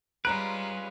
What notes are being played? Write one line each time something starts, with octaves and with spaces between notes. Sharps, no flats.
G3 G#3 C#4 F4 B4 A#5 F#6 D7